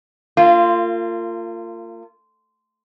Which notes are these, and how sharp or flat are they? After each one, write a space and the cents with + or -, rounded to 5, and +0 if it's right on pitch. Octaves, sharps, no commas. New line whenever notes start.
A#3 -40 F4 -15